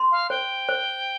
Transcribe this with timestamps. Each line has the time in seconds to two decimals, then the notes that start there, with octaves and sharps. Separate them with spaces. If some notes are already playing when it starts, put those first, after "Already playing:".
Already playing: C6
0.11 F5
0.30 C5 G5
0.69 C5